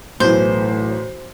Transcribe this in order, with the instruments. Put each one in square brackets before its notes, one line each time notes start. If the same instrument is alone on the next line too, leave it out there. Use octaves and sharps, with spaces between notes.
[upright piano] B1 E3 [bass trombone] A2 [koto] C5